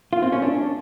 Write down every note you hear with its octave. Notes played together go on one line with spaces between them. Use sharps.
F4
C4
C#4
D4